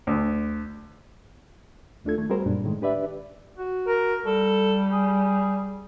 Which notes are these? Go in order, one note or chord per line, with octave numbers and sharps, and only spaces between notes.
D2
D#2 A3 D4 F4 A4 G#6
D#3 A3
G3 C4 F#4 G#4 A#4 C5
F#2 A#2 G3 D4
A2 D#3 G#3
D4 G4 B4 D5 E5
F#4
A#4
G3 A4
G#4